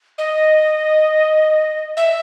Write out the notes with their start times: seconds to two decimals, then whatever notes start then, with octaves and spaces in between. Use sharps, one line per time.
0.18 D#5
1.97 E5